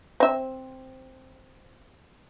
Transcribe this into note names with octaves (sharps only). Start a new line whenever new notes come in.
C4 E5